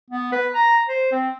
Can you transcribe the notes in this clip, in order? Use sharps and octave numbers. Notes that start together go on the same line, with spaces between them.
B3
B4
A#5
C5
C4